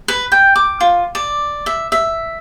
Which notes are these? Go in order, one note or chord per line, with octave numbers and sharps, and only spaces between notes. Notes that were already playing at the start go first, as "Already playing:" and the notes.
B4
G5
D6
F4
D5
E5
E5